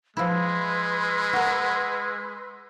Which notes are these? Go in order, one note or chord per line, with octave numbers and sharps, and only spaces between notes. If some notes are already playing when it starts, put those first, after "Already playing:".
F3 G#3 E4 B4 C6 E6
F#4 A#4